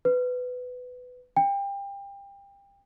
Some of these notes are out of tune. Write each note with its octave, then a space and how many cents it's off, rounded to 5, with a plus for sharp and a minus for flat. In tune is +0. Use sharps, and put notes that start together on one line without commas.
B4 +15
G5 +30